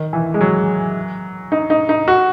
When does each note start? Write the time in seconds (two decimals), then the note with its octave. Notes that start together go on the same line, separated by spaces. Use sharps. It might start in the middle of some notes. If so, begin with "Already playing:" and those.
Already playing: D#3
0.13 E3
0.34 G#3
0.41 F#3
1.52 D#4
1.70 D#4
1.89 D#4
2.08 F#4